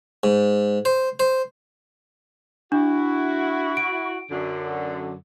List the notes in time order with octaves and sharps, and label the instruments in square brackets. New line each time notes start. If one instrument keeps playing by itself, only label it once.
[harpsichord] G#2
C5
C5
[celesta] D4 [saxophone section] E4 F#4
[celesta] D7
[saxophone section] F#2 D3